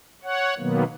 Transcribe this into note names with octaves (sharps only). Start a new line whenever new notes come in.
C#5 F#5
B2 D#3 F#3 A#3 B3